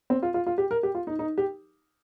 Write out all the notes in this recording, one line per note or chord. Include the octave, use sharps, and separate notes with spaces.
C4
F4
F4
F4
G4
A#4
G4
F4
D#4
D#4
G4